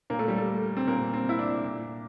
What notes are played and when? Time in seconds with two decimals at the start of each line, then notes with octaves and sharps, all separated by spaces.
0.10 A#2 A#3
0.19 A3
0.28 G3
0.38 A3
0.77 C4
0.87 A#2 A#3
1.14 C4
1.29 E4
1.39 D4
1.64 A#2